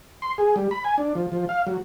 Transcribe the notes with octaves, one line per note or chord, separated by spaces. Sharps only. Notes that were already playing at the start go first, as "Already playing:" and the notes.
C6
G#4
G3
B5
G#5
D4
F3
F3
F5
F#3